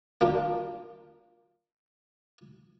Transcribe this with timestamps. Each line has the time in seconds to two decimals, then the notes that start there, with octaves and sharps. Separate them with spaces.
0.21 A#3 D4 F4